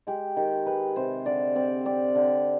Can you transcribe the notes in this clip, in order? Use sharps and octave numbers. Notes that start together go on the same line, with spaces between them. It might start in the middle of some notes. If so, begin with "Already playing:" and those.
G#3 G4
D#3 G4
G#3 B4
C3 C5
D3 D5
C4 D5
C4 D5
D3